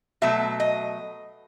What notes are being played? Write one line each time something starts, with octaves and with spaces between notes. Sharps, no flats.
B2 F#3 A3 E5
D#5